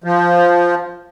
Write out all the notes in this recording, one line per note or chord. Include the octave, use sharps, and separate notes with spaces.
F3